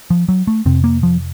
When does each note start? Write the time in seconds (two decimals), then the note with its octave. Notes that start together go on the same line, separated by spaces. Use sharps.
0.10 F3
0.29 F#3
0.47 A3
0.65 F2 C3 C4
0.84 A#3
1.03 F3